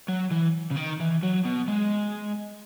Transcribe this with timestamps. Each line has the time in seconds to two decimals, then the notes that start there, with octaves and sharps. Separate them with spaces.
0.09 F#3
0.32 E3
0.71 C#3
0.77 D#3
1.00 E3
1.23 F#3
1.45 B2
1.68 G#3